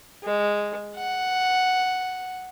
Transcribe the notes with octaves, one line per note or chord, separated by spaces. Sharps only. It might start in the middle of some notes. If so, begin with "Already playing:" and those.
G#3
F#5